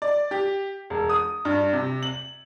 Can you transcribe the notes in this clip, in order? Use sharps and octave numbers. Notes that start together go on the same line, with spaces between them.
D5
G4
E1
D#6
G2
C3
F#7